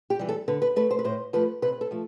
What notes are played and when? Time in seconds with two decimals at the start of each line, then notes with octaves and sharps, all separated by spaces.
0.10 G4
0.19 E3 G3
0.29 A4
0.48 D3 B4
0.62 B4
0.76 A3 B4
0.91 C5
0.99 B4
1.04 A2 C5
1.33 F3 A3 B4
1.62 C3 B4
1.81 A4
1.91 F3 A3